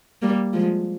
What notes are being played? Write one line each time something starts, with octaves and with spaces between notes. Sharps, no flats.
G3 A#3
F3 G#3